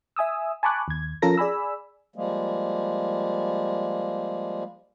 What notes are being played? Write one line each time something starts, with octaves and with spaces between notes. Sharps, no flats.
E5 G#5 D#6 E6
G#5 A5 B5 C#6 D6 F#6
D#2 G#6
F3 C#4 F4 A4 A#4 A#6
G#4 D5 G#5 B5 E6
F3 G3 G#3 A#3